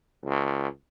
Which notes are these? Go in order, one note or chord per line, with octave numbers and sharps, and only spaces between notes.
C#2